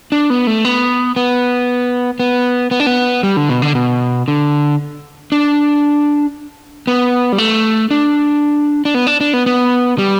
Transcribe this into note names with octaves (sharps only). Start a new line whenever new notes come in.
D4
B3
A3
B3
B3
B3
B3
D4
B3
G3
D3
B2
D3
B2
D3
D4
B3
G3
A3
D4
D4
B3
D4
D4
B3
B3
G3